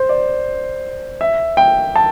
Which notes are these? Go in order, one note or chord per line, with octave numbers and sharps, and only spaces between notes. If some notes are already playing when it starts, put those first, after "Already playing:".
Already playing: C5
D5
E5
G5
A5